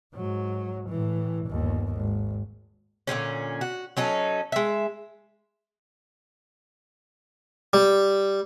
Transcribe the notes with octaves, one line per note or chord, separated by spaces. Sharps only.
G#2 F#3
A2 E3
G1 D#2
G#1
A#2 D3 D#3 C#4
F#4
F#3 C#4 D#4 A4
G#3 E5
G3